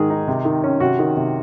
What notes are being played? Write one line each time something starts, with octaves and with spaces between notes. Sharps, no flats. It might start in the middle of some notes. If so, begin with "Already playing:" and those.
Already playing: G#2 D#3 G#4
D#4
C3
D#3
C#4
C3 F#4
D#3
C3